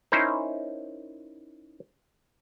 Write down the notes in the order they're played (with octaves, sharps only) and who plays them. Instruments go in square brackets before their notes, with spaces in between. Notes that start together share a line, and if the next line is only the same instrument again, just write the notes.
[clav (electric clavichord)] C#4 D#4 E4 A#4 C5